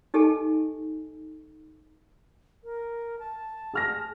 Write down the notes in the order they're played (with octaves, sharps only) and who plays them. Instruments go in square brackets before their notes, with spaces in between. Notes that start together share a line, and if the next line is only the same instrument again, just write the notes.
[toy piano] D#4 G4 A4 D#5 G#5 A5
[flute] A#4
A5
[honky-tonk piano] G#4 F6 A#6